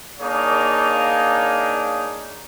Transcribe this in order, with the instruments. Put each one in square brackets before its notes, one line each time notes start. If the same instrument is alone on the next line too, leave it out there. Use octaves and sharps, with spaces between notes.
[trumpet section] A#3 D4 D#4 G#4 C#5 F5